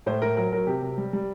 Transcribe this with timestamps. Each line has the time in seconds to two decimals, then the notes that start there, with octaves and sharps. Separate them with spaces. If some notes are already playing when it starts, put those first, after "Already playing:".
0.06 A2 C5
0.22 A2 A#4
0.37 F#3 A#4
0.53 F#3 A#4
0.67 C3 G4
0.82 C3
0.98 G3
1.13 G3